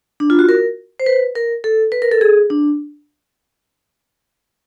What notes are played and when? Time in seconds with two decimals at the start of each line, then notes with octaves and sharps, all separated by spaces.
0.20 D4
0.30 F4
0.39 F#4
0.49 A#4
1.00 C5
1.06 B4
1.35 A#4
1.64 A4
1.92 B4
2.02 A#4
2.12 A4
2.21 G#4
2.50 D4